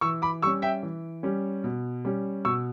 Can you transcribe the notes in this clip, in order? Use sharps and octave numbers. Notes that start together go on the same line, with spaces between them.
E3 C#6 E6
B5 D6
G3 C#4 C#6 E6
E5 G5
E3
G3 C#4
B2
G3 C#4
B2 C#6 E6